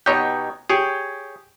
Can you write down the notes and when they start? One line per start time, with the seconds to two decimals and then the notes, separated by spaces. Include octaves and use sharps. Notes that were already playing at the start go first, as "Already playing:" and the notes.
0.06 B2 B3 D#4 G4 C#5 G5
0.70 G4 G#4 C#5 G5